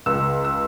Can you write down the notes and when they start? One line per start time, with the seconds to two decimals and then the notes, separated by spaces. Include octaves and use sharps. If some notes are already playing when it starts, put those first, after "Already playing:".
0.06 C#2 E6
0.45 E6